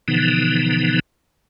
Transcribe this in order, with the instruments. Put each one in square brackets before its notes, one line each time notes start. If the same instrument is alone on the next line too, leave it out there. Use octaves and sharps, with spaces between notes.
[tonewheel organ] B2 D3 E3 F3 B3 D#4